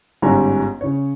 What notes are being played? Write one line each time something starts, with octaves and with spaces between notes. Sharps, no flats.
G1 G#2 G3 C#4 G#5 A#5
C#3 C#5